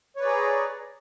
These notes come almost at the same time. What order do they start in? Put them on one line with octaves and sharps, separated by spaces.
C#5 B4 D5 G#4 A#5